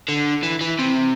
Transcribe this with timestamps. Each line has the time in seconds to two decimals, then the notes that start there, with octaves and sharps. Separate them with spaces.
0.08 D3
0.43 E3
0.61 E3
0.79 C3